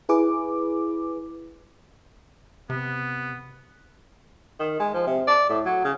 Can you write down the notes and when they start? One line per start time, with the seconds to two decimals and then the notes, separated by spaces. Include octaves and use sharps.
0.09 E4 G#4 B4 D6
2.70 C3 B3
4.59 D#3
4.79 G#3
4.94 F3
5.07 C3
5.27 D5
5.49 A2
5.65 F#3
5.84 C#3